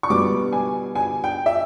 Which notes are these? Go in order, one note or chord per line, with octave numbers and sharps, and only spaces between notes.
C#6
B2 G3 B3 D6
G#5
G#5
G5
E5